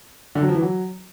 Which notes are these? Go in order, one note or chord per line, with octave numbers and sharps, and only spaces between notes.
D3
F#3
F3
E3
F#3